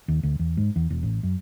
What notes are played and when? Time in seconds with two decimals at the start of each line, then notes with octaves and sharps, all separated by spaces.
0.08 D#2
0.23 D2
0.39 E2
0.57 G#2
0.76 E2
0.90 E1
1.03 A1
1.23 F#2